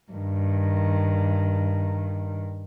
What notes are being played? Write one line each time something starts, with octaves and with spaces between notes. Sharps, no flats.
G2 D#3